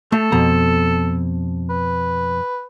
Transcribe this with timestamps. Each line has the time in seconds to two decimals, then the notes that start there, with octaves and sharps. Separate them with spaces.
0.12 A3 A4
0.32 F2 B2 A#5
1.70 B4